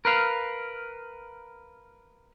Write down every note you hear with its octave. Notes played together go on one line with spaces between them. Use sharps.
A#4 B4 F5